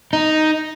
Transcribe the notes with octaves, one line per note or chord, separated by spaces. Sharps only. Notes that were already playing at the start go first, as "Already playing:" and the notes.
D#4